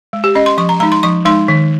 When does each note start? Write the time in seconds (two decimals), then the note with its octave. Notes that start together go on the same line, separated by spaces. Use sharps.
0.13 G#3
0.24 G4
0.35 C#4 D#5
0.46 C6
0.58 F3 C#6
0.69 A#5
0.80 G#3 A#5
0.83 D#4
0.92 C6
1.03 F3 C#6
1.25 G#3 D#4 C6
1.48 D#3